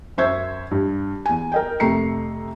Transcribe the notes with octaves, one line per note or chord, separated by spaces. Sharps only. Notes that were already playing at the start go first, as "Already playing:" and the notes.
F#2 C5 E5 C#6 G#6
G2
E2 G#5
A#4 D#5 G5
F2 C3 A3 A#5 C7 C#7